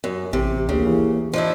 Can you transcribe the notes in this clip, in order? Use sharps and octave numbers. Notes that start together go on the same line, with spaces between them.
F#2
A1 C3 G4
D2 C#3 A#3
E3
F3 D4 E4 D#5